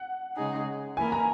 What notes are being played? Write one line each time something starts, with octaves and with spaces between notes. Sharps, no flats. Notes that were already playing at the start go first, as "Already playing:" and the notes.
Already playing: F#5
C#3 G#3 D#4 G#4
E3 A#3 E4 A#4 G#5
A#5